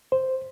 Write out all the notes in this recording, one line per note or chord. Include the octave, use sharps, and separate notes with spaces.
C5